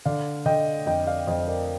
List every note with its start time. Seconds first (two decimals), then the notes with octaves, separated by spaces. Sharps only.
0.05 D3 D5 F5
0.45 D3 D#5 G5
0.86 F2 D#5 G5
1.07 D5 F5
1.27 F2 C5 D#5
1.48 A#4 D5